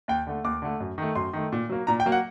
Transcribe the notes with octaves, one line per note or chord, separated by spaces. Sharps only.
D#2 G5
D3 A3
D#2 D6
D3 A3
F#2
D#3 A3
F#2 C6
D#3 A3
A#2
F#3 A#3
A#2 A#5
G5
F#3 A#3
F#5